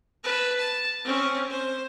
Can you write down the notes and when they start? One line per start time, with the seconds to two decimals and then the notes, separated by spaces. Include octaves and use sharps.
0.24 B4 A5
0.57 A5
1.04 C4 C#4
1.50 C5